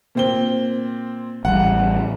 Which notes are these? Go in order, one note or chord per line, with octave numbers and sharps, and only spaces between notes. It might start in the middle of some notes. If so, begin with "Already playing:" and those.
A#2 C4 G7
A1 G3 F#5